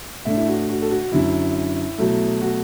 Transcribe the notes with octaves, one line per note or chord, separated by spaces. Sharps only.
A2 A3 D4 E5
E4
F#4
F#4
A4
F#4
F#2 D3 F#3 E4
B2 F#3 A3
F#4